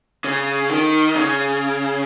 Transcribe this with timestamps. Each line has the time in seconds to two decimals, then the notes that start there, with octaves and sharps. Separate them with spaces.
0.24 C#3
0.70 D#3
1.16 C#3